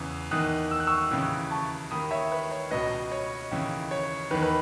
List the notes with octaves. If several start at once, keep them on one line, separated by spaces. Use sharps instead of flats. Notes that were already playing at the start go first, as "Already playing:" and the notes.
Already playing: E2 C#3 E3
E2 D#3 D#6 F#6
E6
F#6
C#6 E6
D#2 C#3 E3
A5 C#6
D#2 D#3 B5 D#6
C#5 E5
B4
C#5
C#2 B2 B4 D#5
C#5
D#2 C#3 E3
C#5
E2 D#3 B4
B4